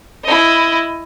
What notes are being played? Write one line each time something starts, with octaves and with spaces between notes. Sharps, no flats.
E4 D#5